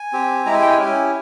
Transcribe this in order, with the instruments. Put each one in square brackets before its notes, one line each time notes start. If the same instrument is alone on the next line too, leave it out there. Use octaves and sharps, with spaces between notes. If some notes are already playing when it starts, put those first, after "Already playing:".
Already playing: [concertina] G#5
C4 G4
G#3 E4 G4 A#5
G#5
G5
G#5
C#4 E4 G4